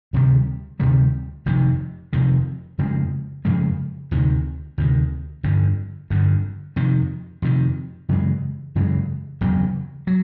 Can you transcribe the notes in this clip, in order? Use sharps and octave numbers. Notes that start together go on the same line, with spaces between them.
D2 C3 D#3 G3
D2 C3 D#3 G3
F1 F2 C3 D#3
F1 F2 C3 D#3
F2 C#3 F3 G#3
F2 C#3 F3 G#3
D2 C3 D#3
D2 C3 D#3
G1 F2 D3
G1 F2 D3
F2 C3 D#3
F2 C3 D#3
F#2 C#3 E3 G#3
F#2 C#3 E3 G#3
F#1 E2 C#3 F#3
F#3